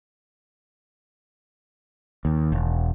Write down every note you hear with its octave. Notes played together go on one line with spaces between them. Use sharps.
D#2
E1